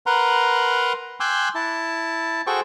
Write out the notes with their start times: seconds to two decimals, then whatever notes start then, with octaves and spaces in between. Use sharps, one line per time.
0.06 A#4 B4 F#5 A#5 C6
1.20 G5 G#5 C6 D6 E6 F#6
1.55 E4 A5
2.47 F#4 G#4 A4 C5 G5 C#6